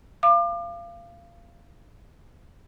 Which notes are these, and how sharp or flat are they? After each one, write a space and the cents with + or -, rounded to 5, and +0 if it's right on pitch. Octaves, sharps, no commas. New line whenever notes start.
F5 -25 D6 +35